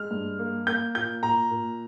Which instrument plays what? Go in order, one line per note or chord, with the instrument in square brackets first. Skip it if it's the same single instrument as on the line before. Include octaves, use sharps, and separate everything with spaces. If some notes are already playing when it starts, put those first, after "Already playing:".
Already playing: [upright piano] G#3 F6
G2
A#3
A#3 G6
A#2 G6
A#2 A#5
A#2